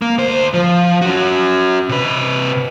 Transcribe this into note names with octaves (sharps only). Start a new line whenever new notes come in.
A#3
D2 C5
F3
C#4 F#4
C3 B4